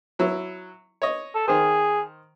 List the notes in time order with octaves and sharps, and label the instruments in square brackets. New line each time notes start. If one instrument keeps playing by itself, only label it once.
[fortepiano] F#3 E4
C#5 D#5
[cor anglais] A4
[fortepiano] D#3 C5 [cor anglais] G#4